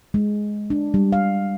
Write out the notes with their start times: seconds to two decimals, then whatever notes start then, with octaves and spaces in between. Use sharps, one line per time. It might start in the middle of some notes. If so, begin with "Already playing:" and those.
0.14 G#3
0.70 D4
0.94 G3
1.13 F5